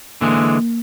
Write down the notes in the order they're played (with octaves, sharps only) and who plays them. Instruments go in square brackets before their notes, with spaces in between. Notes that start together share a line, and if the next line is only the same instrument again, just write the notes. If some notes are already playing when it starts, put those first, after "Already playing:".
[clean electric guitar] D3 E3 G#3 [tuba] A#3